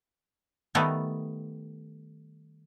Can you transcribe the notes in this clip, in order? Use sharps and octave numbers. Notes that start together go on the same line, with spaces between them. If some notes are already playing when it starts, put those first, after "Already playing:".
D#3 G3 A3 B3 D#4